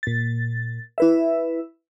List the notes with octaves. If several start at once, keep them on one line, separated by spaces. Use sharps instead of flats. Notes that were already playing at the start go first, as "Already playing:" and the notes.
A#2 A6
E4 B4 E5